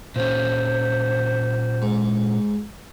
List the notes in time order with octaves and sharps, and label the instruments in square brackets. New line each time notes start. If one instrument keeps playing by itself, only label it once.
[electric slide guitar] A#2 C#4 [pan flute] C5
[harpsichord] G#2